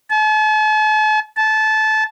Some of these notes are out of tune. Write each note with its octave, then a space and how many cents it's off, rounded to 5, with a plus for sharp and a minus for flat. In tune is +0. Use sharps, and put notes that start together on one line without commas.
A5 -45
A5 -20